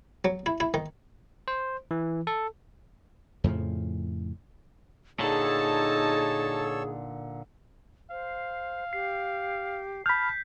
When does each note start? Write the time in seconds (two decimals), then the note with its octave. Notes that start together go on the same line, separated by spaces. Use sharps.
0.25 F#3
0.46 E4
0.60 E4
0.74 D#3
1.48 C5
1.91 E3
2.27 A4
3.44 F2 A2 C#3 F3
5.19 A#2 D3 D#4 G#4 A4 C#5 A5 E6
8.11 C5 F5
8.93 G4 C7
10.06 A5 B5 F6 G6 B6